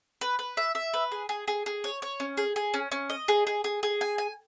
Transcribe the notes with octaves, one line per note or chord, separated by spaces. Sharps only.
B4
B4
E5
E5
B4
G#4
G#4
G#4
G#4
C#5
C#5
C#4
G#4
G#4
C#4
C#4
D#5
G#4
G#4
G#4
G#4
G#5
G#5